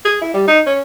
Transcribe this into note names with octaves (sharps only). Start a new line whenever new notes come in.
G#4
E4
G3
D#4
C#4